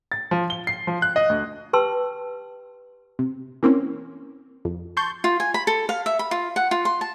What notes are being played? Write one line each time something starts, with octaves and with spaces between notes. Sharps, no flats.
A6
F3
G7
C7
F3
F#6
D#5
D2
G4 B4 G5 A5 C6 E6
C3
E3 A#3 C4 C#4
F2
A5 C6 C#6 G6
F4
G#5
B5
A4
F5
E5
B5
F4
F#5
F4
C6
A5